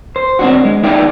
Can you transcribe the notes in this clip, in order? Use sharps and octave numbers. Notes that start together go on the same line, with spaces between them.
C5
C4 D4 F#4
G#3
D#4 E4 G#4 D5 E5 G5